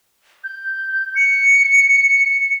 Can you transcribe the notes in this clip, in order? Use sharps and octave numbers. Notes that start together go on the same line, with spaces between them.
G6
C#7